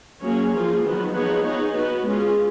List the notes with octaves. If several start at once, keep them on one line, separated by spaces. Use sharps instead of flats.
F#3 A#3 C#4 G#4 C#5
F3 A#3 F4 G#4
D#3 F#3 B3
F3 B3 D#4 G#4 C#5
B3 D#4 G#4 C#5
B3 F#4 B4
G#3 C#4 F4 G#4